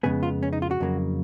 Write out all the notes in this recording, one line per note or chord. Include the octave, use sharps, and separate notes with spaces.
F2 C#3 G#3 B3 G#4
F4
C#4
D#4
F4
F#4
F2 C#3 F#3 A#3